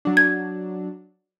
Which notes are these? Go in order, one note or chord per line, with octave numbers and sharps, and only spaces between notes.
F#3 D4
G#6